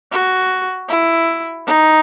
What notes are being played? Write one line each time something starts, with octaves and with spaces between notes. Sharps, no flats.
F#4
E4
D#4